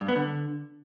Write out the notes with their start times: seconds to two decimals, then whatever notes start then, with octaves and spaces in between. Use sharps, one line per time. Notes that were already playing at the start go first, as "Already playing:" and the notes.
0.01 G2
0.08 B3
0.16 D3